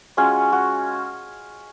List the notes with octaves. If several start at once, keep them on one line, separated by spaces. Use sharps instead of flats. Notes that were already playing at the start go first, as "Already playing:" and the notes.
G#3 C#4 F4 F#4
F#4